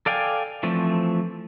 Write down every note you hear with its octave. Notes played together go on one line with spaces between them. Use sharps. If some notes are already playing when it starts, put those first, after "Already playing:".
A4 D5 F5 G5 G#5
E3 F3 A3 C4